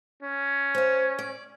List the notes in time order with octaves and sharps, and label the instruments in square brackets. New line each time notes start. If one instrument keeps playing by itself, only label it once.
[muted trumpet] C#4
[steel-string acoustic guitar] C5 F5
D5